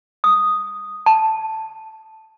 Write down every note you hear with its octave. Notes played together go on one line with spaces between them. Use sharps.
D#6
A5